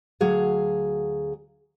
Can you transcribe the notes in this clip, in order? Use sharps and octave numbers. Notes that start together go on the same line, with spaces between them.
D2 F#3 G#4 F5